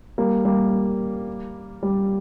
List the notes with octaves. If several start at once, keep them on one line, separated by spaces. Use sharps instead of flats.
G3 A#3
G3 A#3
G3